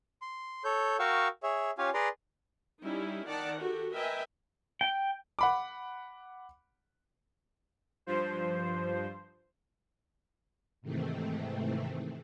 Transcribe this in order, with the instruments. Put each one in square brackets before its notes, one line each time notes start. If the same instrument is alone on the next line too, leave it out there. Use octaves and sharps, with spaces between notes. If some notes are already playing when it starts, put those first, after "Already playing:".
[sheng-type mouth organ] C6
A4 C#5 G6
F#4 A#4 F5 G5 C#6 E6
G#4 C#5 E5
C#4 F4 G4 C#5 F5 G#5
G#4 B4 D5 A#5 C6
[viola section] G3 C#4 D#4 E4
D#3 D5 F#5 A5
F#4 G4 A4
A#4 B4 D#5 E5 G5 G#5
[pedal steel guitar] G5
[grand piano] F#5 B5 D6
[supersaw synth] G2 F3 C5
[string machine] G#2 C3 D#3 E3 A3 C4